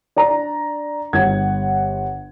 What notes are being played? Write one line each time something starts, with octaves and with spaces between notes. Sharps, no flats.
D4 D5 A#5
G1 F#5 G#6